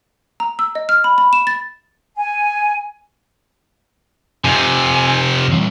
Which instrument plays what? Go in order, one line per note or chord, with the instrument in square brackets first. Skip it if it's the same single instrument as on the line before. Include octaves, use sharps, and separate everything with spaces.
[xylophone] A#5
E6
D#5
F6
B5
B5
E7
A6
[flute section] G#5
[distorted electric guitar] F2 C3 [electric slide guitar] G#5
[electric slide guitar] A#2 G3 C4